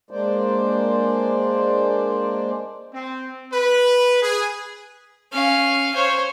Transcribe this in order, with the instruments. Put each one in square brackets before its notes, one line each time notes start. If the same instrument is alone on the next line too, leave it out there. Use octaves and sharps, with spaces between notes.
[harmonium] G#3 A#3 D4 C5 D5
[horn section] C4
B4
G#4
[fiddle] C#4 F5
C5 C#5